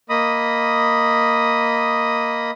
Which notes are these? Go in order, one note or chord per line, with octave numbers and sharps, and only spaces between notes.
A#3 D#5 B5 D#6